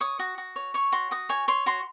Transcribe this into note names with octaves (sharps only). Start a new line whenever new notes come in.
C#5 D#6
F#4
F#4
C#5
C#5 C#6
F#4 C6
F#4 D#6
C#5 G#5
C#5 C6
F#4 C6